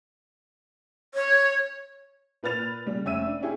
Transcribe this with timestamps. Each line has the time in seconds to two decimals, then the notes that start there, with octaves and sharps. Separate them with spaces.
1.14 C#5
2.43 A#2 B4 F6 A6 F7
2.87 C#3 G3
3.05 F1 C#4 E5 E6 D#7
3.26 D4
3.42 C#4 E4 G4 G#4